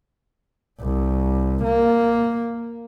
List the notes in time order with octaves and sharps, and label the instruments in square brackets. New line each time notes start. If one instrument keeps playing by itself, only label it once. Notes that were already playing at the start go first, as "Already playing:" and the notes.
[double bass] C2
A#3